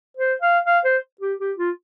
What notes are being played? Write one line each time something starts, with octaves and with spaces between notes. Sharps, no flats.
C5
F5
F5
C5
G4
G4
F4